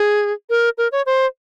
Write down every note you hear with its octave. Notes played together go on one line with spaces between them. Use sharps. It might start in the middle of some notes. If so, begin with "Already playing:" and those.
Already playing: G#4
A#4
A#4
C#5
C5